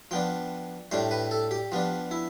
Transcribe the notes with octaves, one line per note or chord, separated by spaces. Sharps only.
F3 B3 D4 G5
A2 G3 D4 C5
B4
A4
G4
F3 B3 D4
E4